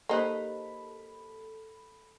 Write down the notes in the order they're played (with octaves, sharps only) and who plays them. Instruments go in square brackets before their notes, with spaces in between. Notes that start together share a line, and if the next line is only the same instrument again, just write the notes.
[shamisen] A#3 D#4 [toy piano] G4 C5 [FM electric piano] A4 B5